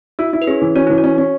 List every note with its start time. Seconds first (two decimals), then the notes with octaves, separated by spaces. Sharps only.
0.19 E4 F#4
0.33 E4
0.42 B4
0.47 C#4 G#4
0.62 E3
0.76 C#4 F#4
0.87 E3 E4
0.98 F#4
1.04 C#4
1.18 C#4